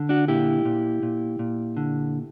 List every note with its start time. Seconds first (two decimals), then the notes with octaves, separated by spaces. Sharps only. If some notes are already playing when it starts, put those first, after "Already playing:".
Already playing: D3
0.09 D4 F#4
0.28 A#2 E4 G4
0.65 A#2
1.03 A#2
1.39 A#2
1.77 D3